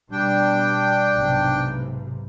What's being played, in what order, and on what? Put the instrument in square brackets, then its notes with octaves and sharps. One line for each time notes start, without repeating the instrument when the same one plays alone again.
[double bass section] B2 G3 [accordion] D4 G5
[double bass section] B1 G#2 C3